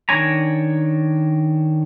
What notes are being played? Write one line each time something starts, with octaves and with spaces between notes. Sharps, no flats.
D#3 D4 C#5 G#5 A#5